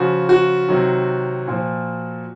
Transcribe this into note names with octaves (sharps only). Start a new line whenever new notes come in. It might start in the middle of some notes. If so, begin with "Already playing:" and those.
Already playing: C#3 F3 F#4
F#4
C3 D#3 F#3
A#2 F3